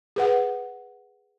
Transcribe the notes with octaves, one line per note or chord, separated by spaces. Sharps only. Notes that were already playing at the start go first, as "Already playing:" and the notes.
G#4 B4 F#5